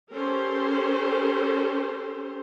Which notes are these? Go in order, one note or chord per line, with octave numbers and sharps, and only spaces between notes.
C#4 G4 A4 A#4 C5